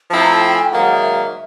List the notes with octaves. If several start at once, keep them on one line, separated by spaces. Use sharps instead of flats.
F3 A3 C4 E4 A5
A#5
A5
G5
G#5
G5
G#2 D#3 F#3 A#3 F#5
F#5
E5